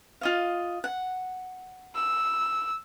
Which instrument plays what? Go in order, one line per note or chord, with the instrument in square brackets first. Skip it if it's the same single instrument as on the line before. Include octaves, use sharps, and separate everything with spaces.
[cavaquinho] F4 D#5 F5
F#5
[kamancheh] E6